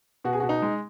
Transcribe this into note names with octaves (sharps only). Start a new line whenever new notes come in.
B2 F#4
G#4
B2 F#4
D#4
G#3